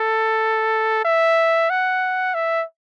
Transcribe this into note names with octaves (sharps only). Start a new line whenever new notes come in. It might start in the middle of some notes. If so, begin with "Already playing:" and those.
Already playing: A4
E5
F#5
E5